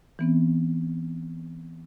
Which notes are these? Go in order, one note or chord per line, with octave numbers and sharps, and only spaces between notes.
E3 B3 C4